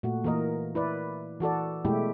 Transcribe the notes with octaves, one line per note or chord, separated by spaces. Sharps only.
A#2 A3 F#4
E3 A#3 A#4 D#5
E4 B4 D5
E3 F#4 A4 D5
B2 G#3 A3 E4 G4